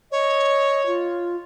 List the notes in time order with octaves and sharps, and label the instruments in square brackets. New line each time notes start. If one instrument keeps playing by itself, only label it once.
[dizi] C#5 [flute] D#5
[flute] F4